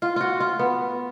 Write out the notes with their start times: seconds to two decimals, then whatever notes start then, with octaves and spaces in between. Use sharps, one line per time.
0.02 F4
0.16 F4 F#4
0.40 F4
0.59 B3